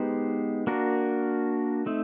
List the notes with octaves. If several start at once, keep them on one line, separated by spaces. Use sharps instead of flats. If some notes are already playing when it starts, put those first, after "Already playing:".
Already playing: G#3 B3 D#4 G4 C5
A#3 D4 F#4 A#4
A3 C4 D#4